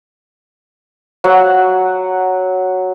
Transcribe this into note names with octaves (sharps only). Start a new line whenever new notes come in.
F#3 F#5